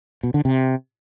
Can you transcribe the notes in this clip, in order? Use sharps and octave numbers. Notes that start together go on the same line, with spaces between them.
B2
D3
C3